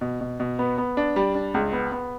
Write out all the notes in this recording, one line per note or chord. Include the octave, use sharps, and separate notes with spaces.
B2
B2
B2
B3
B3
D4
G3
D4
C#2
B3
B3